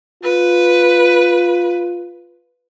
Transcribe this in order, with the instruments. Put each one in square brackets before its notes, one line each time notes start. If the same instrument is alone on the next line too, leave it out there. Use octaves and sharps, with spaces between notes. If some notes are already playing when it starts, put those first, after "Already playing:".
[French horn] F4 [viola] B4